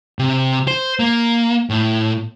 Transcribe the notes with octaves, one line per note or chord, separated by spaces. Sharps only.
C3
C5
A#3
A2